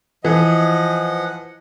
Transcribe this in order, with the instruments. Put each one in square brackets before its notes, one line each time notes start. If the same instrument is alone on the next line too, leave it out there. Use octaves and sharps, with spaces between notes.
[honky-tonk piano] E3 [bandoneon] F3 F#5 [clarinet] D#5